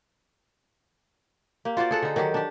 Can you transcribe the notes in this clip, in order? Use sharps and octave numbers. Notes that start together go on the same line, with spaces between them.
A#3 G4
F4 F#4 C5 D5
G#4 A4 F#5
D3 D#4
D#3 F#3 F#4 G4
D4 G4